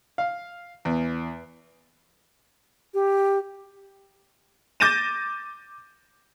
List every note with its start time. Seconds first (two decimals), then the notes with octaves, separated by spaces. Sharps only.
0.18 F5
0.85 E2
2.94 G4
4.80 D6 G6 A6 A#6 D#7 E7